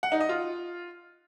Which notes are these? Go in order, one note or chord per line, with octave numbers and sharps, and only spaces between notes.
F#5
D#4
D#5
F4